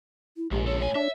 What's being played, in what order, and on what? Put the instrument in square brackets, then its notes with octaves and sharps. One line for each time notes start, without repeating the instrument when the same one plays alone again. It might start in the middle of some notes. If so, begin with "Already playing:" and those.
[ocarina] E4
[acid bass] A#1 [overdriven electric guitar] G#2 [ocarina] G4
[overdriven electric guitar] C#2 A4 [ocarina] C#5
[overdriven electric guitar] A2 G#5 [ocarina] C#5
[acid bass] D4 [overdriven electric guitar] E5